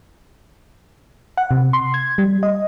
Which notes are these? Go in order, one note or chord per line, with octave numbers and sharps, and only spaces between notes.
F#5
C3
C6
G#6
G3
D#5